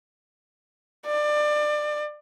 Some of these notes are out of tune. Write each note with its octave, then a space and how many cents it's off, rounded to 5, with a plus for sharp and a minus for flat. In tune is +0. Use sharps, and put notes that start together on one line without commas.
D5 +25